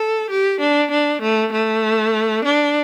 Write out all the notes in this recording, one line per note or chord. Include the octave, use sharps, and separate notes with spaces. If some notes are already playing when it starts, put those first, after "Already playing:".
Already playing: A4
G4
D4
D4
A3
A3
D4